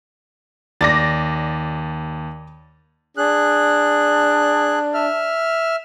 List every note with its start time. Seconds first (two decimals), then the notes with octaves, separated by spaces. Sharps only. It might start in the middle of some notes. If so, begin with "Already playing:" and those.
0.81 D#2 D5 D6 A6 A#6
3.17 D4 G#4 F#6
4.94 E5 F6